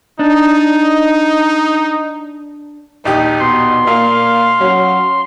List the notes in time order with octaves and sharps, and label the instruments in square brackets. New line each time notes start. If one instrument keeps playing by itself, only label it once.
[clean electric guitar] D4 [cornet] D#4
[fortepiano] A#1 D#2 G4 [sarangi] D#4
[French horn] B2 [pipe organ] C6
[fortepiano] A#2 [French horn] A#3 [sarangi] F5
[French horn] F#3 [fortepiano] C#4